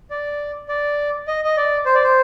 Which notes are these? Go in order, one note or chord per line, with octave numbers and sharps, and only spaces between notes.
D5
D5
D#5
D#5
D5
C5
D5
C5